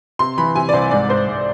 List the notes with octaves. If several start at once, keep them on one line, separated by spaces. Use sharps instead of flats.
C3 C6
E3 B5
C3 G#5
D5
C2 C5
G#2 D5
G#2 C5
G#2